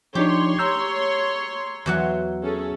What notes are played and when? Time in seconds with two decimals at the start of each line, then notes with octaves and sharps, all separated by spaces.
0.15 F3 D4 D#4 G4 C#5 C6
0.59 A#5 E6 G6
1.86 E2 F#3 F#5
2.43 C#4 G#4 A4